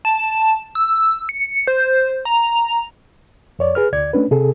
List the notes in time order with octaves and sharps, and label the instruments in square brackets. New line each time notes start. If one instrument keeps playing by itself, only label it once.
[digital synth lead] A5
E6
C#7
C5
A#5
[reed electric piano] F2 C#5 D5
G#4 B4 F6
D2 D5 G#6
A3 C#4 D4 B4
C3 G#4 A4